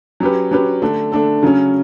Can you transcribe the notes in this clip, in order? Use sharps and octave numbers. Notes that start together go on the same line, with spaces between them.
F#3 C#4 G4 B4
F#3 C#4 G4 B4
D3 A3 D4 A4
D3 A3 D4 A4
C#3 F#3 C#4